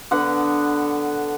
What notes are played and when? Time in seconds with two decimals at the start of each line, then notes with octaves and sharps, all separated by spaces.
0.11 D3 B3 F#5